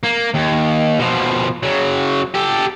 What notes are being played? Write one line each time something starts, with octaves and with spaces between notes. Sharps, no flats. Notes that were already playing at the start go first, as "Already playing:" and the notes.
A#3
D#2
B2 F3
C#3 F#3
G4 A4